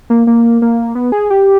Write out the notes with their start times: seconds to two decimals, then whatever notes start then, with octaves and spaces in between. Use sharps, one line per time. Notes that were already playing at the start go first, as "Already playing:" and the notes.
0.10 A#3
0.27 A#3
0.62 A#3
0.95 B3
1.12 G#4
1.30 G4